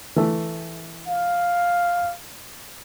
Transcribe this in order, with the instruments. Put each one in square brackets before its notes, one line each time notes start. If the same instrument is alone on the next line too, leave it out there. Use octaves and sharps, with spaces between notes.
[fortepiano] E3 A3
[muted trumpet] F5